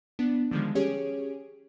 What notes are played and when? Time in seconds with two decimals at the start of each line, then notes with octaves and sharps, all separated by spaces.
0.19 B3 D4
0.51 D3 D#3 F3 G3 G#3
0.75 C#4 G4 G#4 C#5 D7